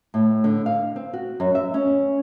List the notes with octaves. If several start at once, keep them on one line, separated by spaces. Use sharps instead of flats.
A2
D3
F5
C4
F#4
F#2
E5
C#4